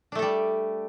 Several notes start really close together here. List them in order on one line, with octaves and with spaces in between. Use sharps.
D4 A3 A4 G3